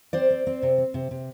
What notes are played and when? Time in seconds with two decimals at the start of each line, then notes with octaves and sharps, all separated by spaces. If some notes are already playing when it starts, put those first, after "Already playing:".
0.13 C4 C5 D5
0.30 C4
0.47 C4
0.63 C3
0.78 C4
0.94 C3
1.11 C3